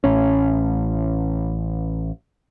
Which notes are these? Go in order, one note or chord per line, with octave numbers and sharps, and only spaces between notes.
A1 C#4